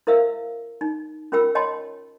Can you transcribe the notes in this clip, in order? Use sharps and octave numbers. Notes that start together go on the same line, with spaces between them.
E4 A#4 C5 E5 F5 E6
D#4
C#4 F4 A#4 G5 B5 E6
C#5 D#5 G5 A5 B5 C6